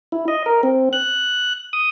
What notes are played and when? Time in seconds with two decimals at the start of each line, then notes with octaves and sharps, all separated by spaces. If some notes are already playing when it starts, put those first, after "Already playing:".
0.12 E4
0.28 D#5
0.46 A#4
0.63 C4
0.93 F#6
1.73 D#6